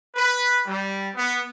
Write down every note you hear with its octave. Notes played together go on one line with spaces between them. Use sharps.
B4
G3
B3